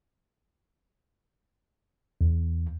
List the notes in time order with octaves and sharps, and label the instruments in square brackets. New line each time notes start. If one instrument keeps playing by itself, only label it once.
[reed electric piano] E2